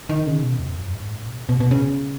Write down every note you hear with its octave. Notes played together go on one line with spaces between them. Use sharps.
D#3
C#3
B2
E2
F#2
G#2
A2
B2
B2
B2
C#3